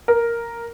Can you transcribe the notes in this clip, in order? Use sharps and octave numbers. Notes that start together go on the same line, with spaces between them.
A#4